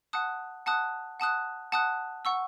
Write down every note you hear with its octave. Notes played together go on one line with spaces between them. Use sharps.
F#5 A5 D#6 F#6
F#5 A5 D#6 F#6
F#5 A5 D#6 F#6
F#5 A5 D#6 F#6
F#5 C#6 E6